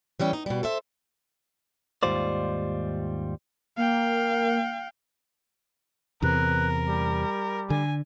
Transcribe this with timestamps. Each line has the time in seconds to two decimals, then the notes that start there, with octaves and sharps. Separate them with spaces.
0.20 E3 G3 C#4 G5
0.33 D#4
0.46 B2 G3
0.63 A4 C5 E5
2.03 D#2 G#2 G3 F4 C5 D5
3.77 A#3 F5 G5
6.22 E2 C3 A#4 B4
6.85 G3
7.70 D3 G#5